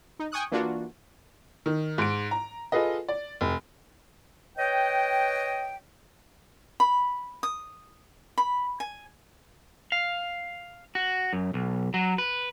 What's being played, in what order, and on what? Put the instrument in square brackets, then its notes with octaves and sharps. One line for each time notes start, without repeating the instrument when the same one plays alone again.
[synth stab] D#4
G5 G#5 C#6 D#6 F#6
E3 A#3 D4 F4 F#4
[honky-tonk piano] D#3
G#2 D7
A#5
F4 G#4 A4 B4 D#5
D5
F1
[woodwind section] B4 C#5 D#5 G5
[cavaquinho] B5
D#6
B5
G#5
[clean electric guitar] F5
F#4
F#2
B1
F#3
B4